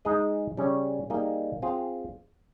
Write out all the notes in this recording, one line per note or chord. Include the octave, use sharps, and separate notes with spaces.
G#3 D#4 G#4 D#5
C#3 G3 C#4
G3 A#3 D#4 G#4 D#5
C4 F4 G#4